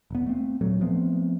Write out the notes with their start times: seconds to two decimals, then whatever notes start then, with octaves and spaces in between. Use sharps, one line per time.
0.11 E1 B3
0.27 A3 C4
0.61 D#1 A#2 F#3 A3
0.81 F3 A3 B3 C4